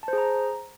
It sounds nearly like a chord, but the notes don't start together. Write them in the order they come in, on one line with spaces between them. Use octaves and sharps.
A5 C5 G#4 A#5